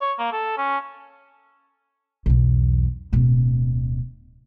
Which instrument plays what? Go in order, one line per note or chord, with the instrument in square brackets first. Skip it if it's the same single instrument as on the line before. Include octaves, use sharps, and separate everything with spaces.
[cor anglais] C#5
A#3
A4
C#4
[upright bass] B1 E2
D1 B2